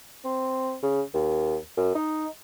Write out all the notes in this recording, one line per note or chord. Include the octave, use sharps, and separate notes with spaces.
C4
C#3
D#2
F#2
D#4